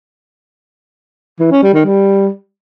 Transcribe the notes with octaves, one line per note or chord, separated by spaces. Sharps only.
E3
C#4
G3
D#3
G3